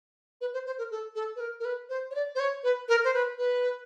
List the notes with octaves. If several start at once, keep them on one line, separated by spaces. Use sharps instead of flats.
B4
C5
C5
A#4
A4
A4
B4
A#4
A#4
B4
C5
C#5
D5
C5
C#5
B4
A#4
C5
B4
B4